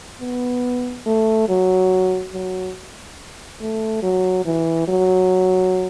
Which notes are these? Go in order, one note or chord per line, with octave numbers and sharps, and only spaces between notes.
B3
A3
F#3
F#3
A3
F#3
E3
F#3